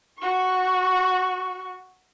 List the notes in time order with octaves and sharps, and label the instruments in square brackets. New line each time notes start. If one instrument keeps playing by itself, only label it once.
[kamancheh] F#4 C#6